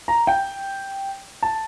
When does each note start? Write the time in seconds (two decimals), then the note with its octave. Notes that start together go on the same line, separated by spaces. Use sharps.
0.08 A#5
0.27 G5
1.42 A5